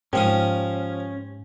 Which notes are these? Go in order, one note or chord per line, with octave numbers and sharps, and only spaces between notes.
G#2 F3 C#4 G4 F5 D#6